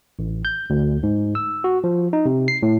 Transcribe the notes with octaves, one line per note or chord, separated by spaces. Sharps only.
A1
G6
D2
G#2
E6
F#4
F3
D#4
C3
C7
A2